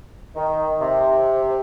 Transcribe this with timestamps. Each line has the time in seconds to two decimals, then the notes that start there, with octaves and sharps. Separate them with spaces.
0.36 D#3
0.80 C3